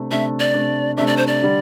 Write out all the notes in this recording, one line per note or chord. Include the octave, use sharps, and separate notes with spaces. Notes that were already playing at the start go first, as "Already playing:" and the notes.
Already playing: C3 A3 D4
C3 A3 D4 E5
D5
C3 A3 D4
C3 A3 D4 E5
D5
C5
D5
D3 G3